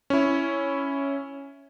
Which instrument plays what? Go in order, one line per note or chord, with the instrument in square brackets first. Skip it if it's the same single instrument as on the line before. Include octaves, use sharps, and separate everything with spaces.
[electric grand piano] C#4 E4